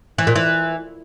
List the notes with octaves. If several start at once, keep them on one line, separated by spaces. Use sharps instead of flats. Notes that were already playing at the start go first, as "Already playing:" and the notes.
E3
A#2
E3